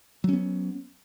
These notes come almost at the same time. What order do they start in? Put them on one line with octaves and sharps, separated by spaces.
F#3 C#4 B3